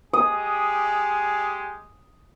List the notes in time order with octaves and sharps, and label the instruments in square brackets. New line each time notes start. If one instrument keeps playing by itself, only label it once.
[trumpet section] G#3 G4 G#4 [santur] D#6